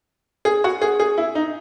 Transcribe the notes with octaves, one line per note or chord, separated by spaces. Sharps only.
G#4
F#4
G#4
G#4
E4
D#4